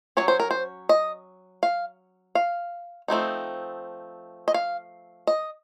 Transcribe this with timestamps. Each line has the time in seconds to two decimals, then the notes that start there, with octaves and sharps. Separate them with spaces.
0.17 F#3 A#3 C#4 C#5
0.28 C5
0.40 A#4
0.51 C5
0.89 D#5
1.63 F5
2.35 F5
3.08 F3 A3 C4 D#4
4.48 D#5
4.54 F5
5.27 D#5